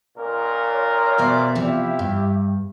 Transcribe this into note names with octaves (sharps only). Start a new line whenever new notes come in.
C#2 A#2 A#4
C#5
B2 C5 D5 E5
C3 F3 E4 G4
G2